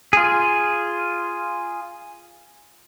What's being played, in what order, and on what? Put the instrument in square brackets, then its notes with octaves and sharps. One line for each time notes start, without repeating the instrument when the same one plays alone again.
[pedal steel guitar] F4 G#4